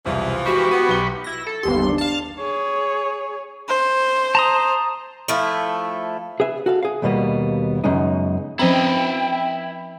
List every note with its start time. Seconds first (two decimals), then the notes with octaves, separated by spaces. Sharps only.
0.05 E1 C2 C3 E3 F3
0.46 G#3 F#4 G4 B5 C#6
0.71 B3 D#7
0.88 B1 G7
1.24 E4 A#6
1.47 A4
1.63 G1 D#2 B3 G4 C6
1.83 D4 D6
1.98 F5 A5
2.39 G#4 C#5
3.68 C5
4.35 A5 A#5 D#6
5.28 F3 A3 E4
6.40 G#4 B4 E5
6.66 F#4 A4 F5
6.83 G#4 F5
7.02 D#2 B2 G3 A#3 B3
7.84 F#2 C#3 G#3 B3 D#4
8.59 F3 C4 C#4 E4 C5 D#5 G5 B5